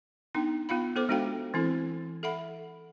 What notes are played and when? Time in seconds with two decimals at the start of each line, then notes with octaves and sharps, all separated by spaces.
0.34 B3 D4 D#4 G5
0.69 B3 F4 F5 B5
0.96 B3 A4 C5 D6
1.09 G#3 D4 F#4 A4 F5 G5
1.54 E3 C4 E4 A4
2.23 A4 E5 F#5 B5